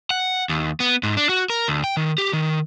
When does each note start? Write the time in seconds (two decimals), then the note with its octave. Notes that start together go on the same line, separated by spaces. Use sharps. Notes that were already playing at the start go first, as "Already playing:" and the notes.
0.10 F#5
0.49 D#2
0.80 B3
1.03 G#2
1.17 D4
1.29 F#4
1.50 A#4
1.68 D2
1.84 G5
1.97 D#3
2.18 G4
2.33 D#3